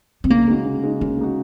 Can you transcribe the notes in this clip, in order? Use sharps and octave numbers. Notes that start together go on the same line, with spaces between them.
C4
C#3 A#3
G#3 D#4 F#4
C#3
G#3 D#4 F#4
C#3 A#3
G#3 D#4 F#4